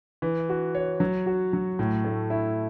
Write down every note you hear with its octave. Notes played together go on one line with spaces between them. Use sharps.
E3
F#4
C#5
F#3
F#4
F#3
A2
A3
E4